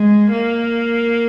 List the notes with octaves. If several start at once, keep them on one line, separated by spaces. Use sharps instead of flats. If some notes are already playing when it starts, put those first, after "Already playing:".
Already playing: G#3
A#3